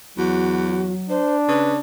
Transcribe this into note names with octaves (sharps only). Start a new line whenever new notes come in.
E2 F#3 F#4
D4 C5
C#3 B4